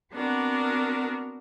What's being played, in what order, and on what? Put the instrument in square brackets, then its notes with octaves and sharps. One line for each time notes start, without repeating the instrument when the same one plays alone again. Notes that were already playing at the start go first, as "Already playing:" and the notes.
[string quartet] B3 C4 D4 F#4 A#4